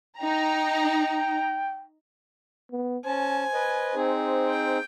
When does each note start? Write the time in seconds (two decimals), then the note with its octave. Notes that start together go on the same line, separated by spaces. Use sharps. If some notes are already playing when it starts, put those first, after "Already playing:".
0.19 D#4 G5 A#5
2.72 B3
3.06 C#4 C5 G#5 A5
3.54 B4 D#5
3.95 C4 D#4 G#4
4.49 G5